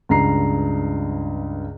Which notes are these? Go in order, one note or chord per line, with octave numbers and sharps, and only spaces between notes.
C#2 G2 A#5 C7